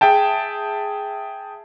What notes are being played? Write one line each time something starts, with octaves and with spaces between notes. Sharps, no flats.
G#4 E5 G5 A5